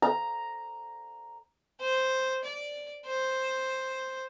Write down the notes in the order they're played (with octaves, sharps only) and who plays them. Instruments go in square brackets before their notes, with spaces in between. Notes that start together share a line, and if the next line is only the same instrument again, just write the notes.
[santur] A#5
[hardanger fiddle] C5
D5
C5